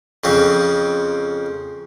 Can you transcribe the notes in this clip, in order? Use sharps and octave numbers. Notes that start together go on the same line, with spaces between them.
F2 C#3 C4